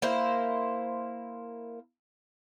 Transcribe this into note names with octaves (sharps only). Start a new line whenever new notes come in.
A#3 E4 C5